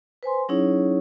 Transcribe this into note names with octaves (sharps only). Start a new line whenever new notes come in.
B4 C5 G#5 C6
F#3 C#4 D#4 E4 G#4 C#5